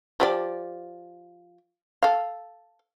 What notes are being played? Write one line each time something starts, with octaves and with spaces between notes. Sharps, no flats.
F3 G4 D5
A4 F5